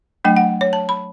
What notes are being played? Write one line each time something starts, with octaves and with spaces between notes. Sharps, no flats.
F#3 A3 D4 G5
F#5
C#5
A5
B5